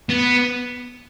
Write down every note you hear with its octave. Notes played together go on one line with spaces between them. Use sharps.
B3